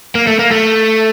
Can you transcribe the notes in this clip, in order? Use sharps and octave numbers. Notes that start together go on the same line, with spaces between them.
A#3
A3
A#3
A3